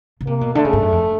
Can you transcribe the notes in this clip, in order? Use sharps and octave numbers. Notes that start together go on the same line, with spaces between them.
C#3
C3 A#3
B2
D3 A3
C#3
G2
F#2
F2